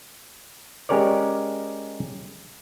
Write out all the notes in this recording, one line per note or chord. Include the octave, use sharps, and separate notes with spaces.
G#3 C#4 G4 A#4 C#5 D5